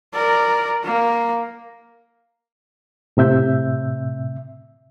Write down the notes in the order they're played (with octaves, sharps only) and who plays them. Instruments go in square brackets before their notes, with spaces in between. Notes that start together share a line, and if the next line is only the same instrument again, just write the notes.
[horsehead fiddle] A#4 D5
A#3
[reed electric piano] A2 C3 E5 G6